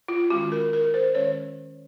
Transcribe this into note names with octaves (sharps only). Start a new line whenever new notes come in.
F4
D#3 G#3 C#4 F#4
A#4
A#4
C5
D#3 G#3 C#4 C#5